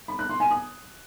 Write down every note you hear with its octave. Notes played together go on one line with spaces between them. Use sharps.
B5
F#6
C6
G#5
D#6